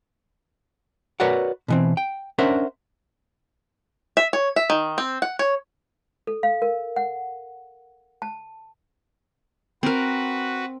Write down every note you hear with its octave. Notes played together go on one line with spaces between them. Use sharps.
F#4 A#4 B4 C#5 D5 F#5
B2 E3 C4
G5
C#4 D4 A#4 C5 E5 F#5
E5
C#5
E5
D#3
C4
F#5
C#5
A4
F5
A#4
F#5
A5
C4 F#4 A#4 B4